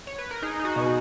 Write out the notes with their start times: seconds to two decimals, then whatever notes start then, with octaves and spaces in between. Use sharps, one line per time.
0.07 C#5
0.18 B4
0.31 A#4
0.42 D#4 G#4
0.59 D#4
0.65 F#4
0.76 B2